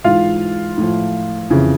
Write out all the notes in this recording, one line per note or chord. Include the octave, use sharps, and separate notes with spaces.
G#2 E3 F4 F5
A2 F3
F2 C#3 E3